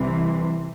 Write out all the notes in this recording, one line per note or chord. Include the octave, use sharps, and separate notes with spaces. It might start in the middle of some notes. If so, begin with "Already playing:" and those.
Already playing: C2 C3 E3